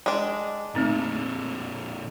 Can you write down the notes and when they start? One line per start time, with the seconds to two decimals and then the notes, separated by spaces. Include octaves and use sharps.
0.06 G#3 D4
0.75 A#2 D3 A3 C4 D#4